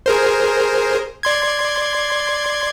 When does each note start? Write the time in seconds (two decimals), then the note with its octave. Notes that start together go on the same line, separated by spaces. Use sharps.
0.06 G#4 A#4 C5
1.23 D5 C6 G#6